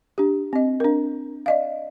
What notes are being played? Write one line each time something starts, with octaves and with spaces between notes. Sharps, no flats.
D4 G4
C4 D#5
D4 A#4
D5 D#5 F5